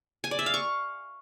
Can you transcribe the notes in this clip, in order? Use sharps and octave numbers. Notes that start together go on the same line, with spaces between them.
G#5
D5
E5
F5
C#6